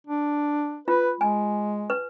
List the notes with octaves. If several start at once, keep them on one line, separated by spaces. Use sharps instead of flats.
D4
F4 B4
G#3 G#5
B4